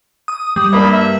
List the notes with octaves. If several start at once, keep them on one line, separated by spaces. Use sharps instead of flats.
D#6
G3 D#6
G2 A#3 B5
E5